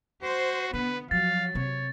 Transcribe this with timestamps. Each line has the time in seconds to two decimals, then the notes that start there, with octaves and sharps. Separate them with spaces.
0.23 F#4 C5
0.74 D3 B3 B4
1.11 F3 F#3 F5 A6
1.55 C3 C4 C#5